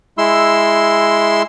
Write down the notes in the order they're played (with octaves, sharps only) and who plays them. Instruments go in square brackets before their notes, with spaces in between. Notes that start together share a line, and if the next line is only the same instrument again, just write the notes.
[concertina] G#3 E4 C6 E6